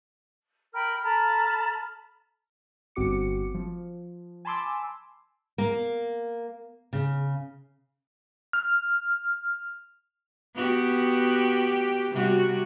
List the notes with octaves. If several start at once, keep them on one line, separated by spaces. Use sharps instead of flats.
A#4 G5 B5 F6
A4 A#5 B5 F6
G1 C4 F#4 D6 C#7
F3
G#5 A5 B5 C6 D6 E6
A#3
C#3
F6
B3 F#4 G4
C3 G3 F#4